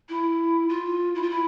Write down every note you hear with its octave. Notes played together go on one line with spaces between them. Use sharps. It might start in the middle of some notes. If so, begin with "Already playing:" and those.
E4
F4
E4
F4
E4